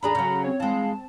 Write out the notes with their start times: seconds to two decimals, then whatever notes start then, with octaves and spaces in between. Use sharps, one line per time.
0.03 D#2 D4 G#4 A#5 B5
0.15 C#3 F#3
0.44 C4 C#5
0.60 E3 G#3 C4 F5 A5